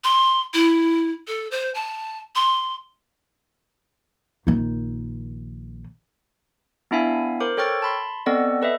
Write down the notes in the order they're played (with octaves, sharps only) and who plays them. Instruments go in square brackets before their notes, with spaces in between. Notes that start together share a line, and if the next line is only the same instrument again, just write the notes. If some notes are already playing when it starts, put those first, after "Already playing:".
[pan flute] C6
E4
A4
C5
A5
C6
[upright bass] A#1 D#3
[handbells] B3 D4 E4 E5 F5 G#5
A#4 C5 D6
A4 C#5 G5 C#6 F6 A6
A5 B5 C6
B3 C4 A4 D5 D#5 F#5
A4 B4 D#5 E5